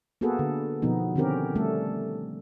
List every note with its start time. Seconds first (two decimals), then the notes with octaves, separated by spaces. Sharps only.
0.21 A#3 B3 F#4 G#4 A4 B4
0.39 D3
0.82 B2 F3 B3 D#4
1.16 D3 D#3 C4 C#4 G4 A#4
1.55 G3 A3 C#4 A4